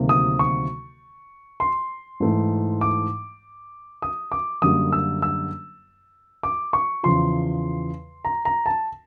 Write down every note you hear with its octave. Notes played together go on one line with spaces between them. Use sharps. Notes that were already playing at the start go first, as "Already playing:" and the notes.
Already playing: D2 C3 D#3 F#3 A#3
D#6
C#6
C6
G#2 E3 A3
D6
D#6
D6
F#2 D3 G3 A#3 D#6
E6
E6
D6
C#6
E2 C#3 F3 C6
A#5
A#5
A5